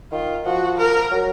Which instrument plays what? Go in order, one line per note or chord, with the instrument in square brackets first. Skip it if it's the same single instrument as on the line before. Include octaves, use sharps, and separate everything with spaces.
[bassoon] D#3 [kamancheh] F4
[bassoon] F3 [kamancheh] F#4
[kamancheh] A#4
[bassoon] F#3